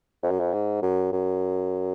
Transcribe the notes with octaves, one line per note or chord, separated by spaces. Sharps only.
F2
F#2
F2
G#2
F#2
F#2